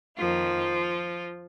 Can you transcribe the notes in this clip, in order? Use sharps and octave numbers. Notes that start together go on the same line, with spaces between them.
F2 D#3 F3 A#3 F4